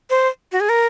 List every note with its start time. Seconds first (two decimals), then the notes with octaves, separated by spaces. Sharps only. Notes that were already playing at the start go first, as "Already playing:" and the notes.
0.10 C5
0.52 F#4
0.60 G#4
0.69 A#4